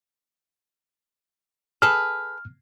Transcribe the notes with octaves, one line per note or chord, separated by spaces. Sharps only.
G#4 A4 B4 F6